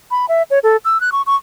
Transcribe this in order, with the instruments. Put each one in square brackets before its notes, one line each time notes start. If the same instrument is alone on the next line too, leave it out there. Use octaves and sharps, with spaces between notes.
[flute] B5
E5
C#5
A4
E6
F#6
C#6
C#6